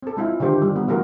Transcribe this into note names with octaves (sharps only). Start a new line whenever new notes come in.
C4 A4
G#3 E4 F4
D3 D#3 G#3 F4 G4 C5
G3
B3
E3 A3 F#4 A#4